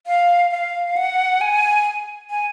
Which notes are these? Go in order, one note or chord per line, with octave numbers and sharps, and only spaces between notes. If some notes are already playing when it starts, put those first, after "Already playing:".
F5
F5
F#5
G#5
G#5